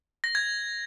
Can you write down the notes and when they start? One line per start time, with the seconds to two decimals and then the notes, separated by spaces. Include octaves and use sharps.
0.24 A#6
0.35 G#6